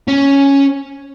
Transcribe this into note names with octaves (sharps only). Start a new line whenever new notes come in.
C#4